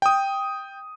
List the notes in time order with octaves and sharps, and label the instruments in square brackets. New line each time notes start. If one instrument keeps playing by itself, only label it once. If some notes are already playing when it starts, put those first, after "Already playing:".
[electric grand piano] G5 D#6